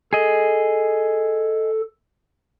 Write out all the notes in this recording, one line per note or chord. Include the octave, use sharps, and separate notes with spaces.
G#4 A4 D#5